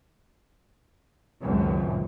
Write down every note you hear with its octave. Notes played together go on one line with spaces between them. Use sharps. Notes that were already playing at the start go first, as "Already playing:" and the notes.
G#1 C#2 F#2 A#2